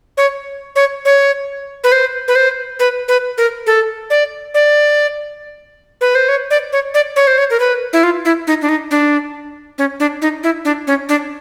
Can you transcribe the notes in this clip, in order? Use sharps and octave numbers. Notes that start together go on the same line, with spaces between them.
C#5
C#5
C#5
B4
C5
B4
C5
B4
B4
A#4
A4
D5
D5
B4
C5
C#5
D5
C#5
D5
C#5
C5
C#5
A#4
B4
E4
F4
E4
D#4
D4
D#4
D4
C#4
D4
D#4
E4
D4
C#4
D4